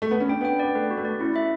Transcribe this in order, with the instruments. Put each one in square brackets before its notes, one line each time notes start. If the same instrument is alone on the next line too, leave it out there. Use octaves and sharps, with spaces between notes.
[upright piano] A3
B3
C#4
[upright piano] D4 [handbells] G5
[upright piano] B3 [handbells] G5
[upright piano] B3 [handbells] D5
[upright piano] A3 [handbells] B4
[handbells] F#4
[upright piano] A3
[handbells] D5
[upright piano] C#4 [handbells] E4
[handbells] E5